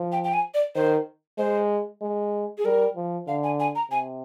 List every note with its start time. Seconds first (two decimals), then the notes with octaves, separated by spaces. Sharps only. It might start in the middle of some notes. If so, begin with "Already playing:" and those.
Already playing: F3
0.12 G5
0.24 G5
0.33 G#5
0.54 D5
0.75 D#3 C5
1.38 G#3 C5
2.02 G#3
2.58 G#4
2.65 G3 A#4
2.96 F3
3.28 D3 F5
3.44 G#5
3.60 G#5
3.75 A#5
3.91 C3 G#5